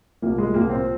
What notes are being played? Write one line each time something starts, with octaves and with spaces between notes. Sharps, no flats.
C2 A#2 F3 A#3
G#3
C2 A#2 F3 A#3
C4